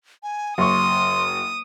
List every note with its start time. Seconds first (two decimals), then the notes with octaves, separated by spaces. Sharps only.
0.23 G#5
0.58 F#1 C6 C#6 D#6